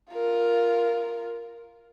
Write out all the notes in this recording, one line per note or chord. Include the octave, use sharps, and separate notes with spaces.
F4 A#4